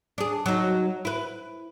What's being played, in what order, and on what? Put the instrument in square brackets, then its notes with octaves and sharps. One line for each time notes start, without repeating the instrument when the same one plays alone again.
[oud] D4 G#4
F#3 D#4
E4 B4